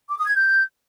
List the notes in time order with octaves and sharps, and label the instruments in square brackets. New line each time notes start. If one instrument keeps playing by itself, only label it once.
[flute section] D6
D#6
G#6
G6